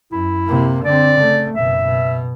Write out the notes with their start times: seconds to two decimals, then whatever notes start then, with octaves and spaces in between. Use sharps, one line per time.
0.12 F#2 E4
0.47 C3 A#3
0.85 D3 C4 D5
1.15 C#3 A3
1.55 F#1 B2 E5
1.85 B2